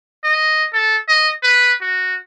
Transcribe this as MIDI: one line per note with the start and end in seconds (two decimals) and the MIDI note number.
0.24 0.65 75
0.73 0.96 69
1.08 1.30 75
1.43 1.73 71
1.81 2.15 66